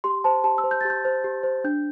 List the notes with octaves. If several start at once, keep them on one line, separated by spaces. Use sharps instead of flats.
G4 C6
C5 A5
G4 A5
E6
C5
G6
G4 A6
G6
C5
G4
C5
D4 G6